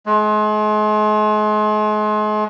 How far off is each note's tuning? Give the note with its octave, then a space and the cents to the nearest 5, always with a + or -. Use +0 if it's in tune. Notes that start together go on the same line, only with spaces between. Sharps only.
G#3 +40